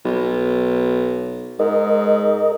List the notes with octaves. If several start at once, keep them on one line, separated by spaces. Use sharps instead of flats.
B1
G#2 A#4 D#5